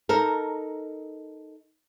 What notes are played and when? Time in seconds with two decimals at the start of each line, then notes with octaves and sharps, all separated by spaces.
0.09 D#4 A4 A#4